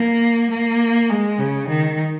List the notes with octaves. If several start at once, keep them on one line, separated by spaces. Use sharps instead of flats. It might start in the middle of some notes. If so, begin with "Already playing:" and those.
Already playing: A#3
A#3
G#3
C#3
D#3